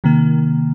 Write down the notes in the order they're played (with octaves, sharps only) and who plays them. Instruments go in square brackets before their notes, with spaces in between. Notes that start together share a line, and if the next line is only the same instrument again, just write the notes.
[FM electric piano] C3 D#3 A#3